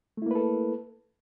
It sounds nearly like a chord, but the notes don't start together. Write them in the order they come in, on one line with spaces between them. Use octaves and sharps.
A3 E4 A#3 B4 A4